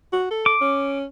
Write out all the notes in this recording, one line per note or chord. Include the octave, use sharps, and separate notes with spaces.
F#4
A4
D6
C#4